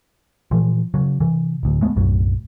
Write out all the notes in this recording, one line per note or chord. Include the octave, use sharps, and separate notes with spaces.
A#2 E3 F3
C#3 F#3
C3 E3
D1 D2
G#3 A3 B3
B1 F#2 A2 F#3